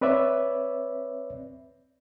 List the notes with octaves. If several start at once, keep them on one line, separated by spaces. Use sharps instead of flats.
C4 B4 C#5 D5 E5